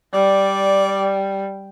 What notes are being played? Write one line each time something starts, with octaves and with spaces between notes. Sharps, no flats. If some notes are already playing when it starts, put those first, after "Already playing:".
G3 D5